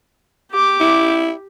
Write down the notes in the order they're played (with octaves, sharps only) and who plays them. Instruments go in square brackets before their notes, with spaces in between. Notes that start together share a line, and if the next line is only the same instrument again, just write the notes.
[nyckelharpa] G4 D6
[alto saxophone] E4